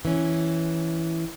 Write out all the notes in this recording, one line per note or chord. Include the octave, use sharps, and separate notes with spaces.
E3 C#4